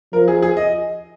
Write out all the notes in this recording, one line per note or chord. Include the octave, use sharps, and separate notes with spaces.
F3 A#4
G#4
G#4
D#5